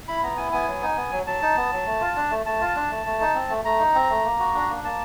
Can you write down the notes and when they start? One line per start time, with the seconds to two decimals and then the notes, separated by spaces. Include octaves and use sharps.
0.08 E4 B5
0.23 B3 A#5
0.37 E4 G#5
0.52 B3 G#5
0.68 F#3
0.83 D#4
0.97 B3
1.12 F#3
1.26 F#3 A5
1.42 D#4
1.57 B3
1.72 F#3
1.86 A3
2.01 F4
2.16 D4
2.31 A3
2.46 A3 A5
2.61 F4
2.76 D4
2.90 A3
3.06 A3
3.20 D#4
3.35 C4
3.50 A3
3.65 A3 A#5
3.79 D#4
3.95 C4
4.10 A3
4.24 A#3
4.39 F#4
4.55 D4
4.69 A#3
4.84 A#3 A5